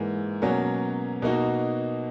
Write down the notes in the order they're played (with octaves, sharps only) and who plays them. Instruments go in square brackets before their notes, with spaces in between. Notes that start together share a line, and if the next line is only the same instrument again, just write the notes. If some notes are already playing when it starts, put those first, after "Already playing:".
Already playing: [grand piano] G#2 E3 A#3
B2 F#3 A#3 C#4
B2 A#3 D#4 F#4